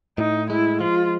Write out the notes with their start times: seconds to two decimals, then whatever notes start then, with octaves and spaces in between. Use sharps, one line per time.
0.18 A2 D#4
0.50 G#3 E4
0.81 F3 F4